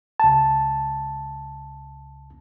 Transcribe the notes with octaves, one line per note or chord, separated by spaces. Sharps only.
C#2 A5